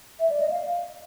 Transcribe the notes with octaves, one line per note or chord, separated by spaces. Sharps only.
E5
D5
D#5
F5